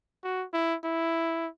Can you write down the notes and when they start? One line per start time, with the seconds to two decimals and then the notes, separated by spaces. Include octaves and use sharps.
0.24 F#4
0.54 E4
0.84 E4